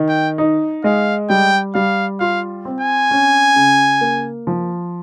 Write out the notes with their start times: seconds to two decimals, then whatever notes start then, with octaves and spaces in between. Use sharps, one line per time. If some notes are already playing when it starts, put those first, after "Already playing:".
Already playing: D#3
0.09 G5
0.38 D#4
0.84 G#3 F5
1.30 G3 G5
1.75 G3 F5
2.20 F4 F5
2.65 C4
2.81 G#5
3.11 C#4
3.56 C#3
4.01 A#3
4.47 F3